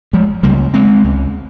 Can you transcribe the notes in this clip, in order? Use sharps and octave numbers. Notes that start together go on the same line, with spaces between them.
F3 G#3
C#2 C#3 G3 A#3
G#3 C4
C#2 C#3